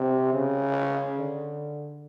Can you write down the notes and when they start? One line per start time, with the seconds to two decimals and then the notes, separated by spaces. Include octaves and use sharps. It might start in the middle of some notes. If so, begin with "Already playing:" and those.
Already playing: C3
0.33 C#3
1.18 D3